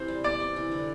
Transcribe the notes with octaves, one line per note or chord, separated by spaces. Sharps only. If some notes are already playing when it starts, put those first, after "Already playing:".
Already playing: C3 E3 C5
G3
B3 D5
C3
E3
D3